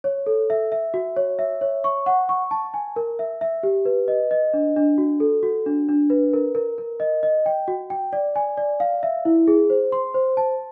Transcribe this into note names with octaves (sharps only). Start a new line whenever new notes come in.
C#5
A4
E5
E5
F#4
C#5
E5
C#5
C#6
F#5
C#6
A5
G#5
A#4
E5
E5
G4
B4
D#5
D#5
D4
D4
F#4
A4
F#4
D4
D4
B4
A#4
A#4
A#4
D#5
D#5
G5
F#4
G5
D5
G#5
D5
F5
E5
E4
G#4
C5
C6
C5
A5